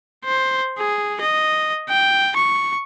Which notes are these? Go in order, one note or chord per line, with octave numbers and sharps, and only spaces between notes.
C5
G#4
D#5
G5
C#6